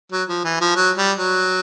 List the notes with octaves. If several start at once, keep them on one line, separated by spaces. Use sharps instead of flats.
F#3
F3
E3
F3
F#3
G3
F#3